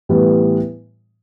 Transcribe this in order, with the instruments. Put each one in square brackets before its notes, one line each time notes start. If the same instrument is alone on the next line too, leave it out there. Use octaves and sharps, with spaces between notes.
[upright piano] A2 E3 G3 B3